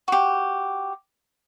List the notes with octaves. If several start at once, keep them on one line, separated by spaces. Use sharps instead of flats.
F#4 G4